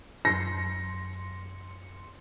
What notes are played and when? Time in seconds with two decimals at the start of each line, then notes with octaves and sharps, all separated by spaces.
0.25 F#2 C6 A#6 C#7